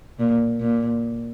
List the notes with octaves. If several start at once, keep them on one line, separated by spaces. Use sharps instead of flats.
A#2
A#2